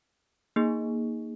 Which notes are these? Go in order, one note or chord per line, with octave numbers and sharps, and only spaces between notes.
A#3 D#4 G#4